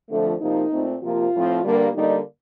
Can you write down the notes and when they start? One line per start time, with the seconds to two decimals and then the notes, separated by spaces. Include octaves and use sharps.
0.10 F2 D3 F3 A3
0.41 C3 F3 A#3 D#4
0.71 A#2 A3 C4
1.02 C3 F3 A#3 F4
1.33 A2 F3 C4
1.64 G2 D3 G3 A#3
1.95 D3 G3 A#3 D#4